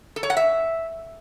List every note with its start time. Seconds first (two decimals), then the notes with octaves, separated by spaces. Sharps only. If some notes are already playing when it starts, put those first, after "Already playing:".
0.16 A4
0.23 C#5
0.30 F#5
0.37 E5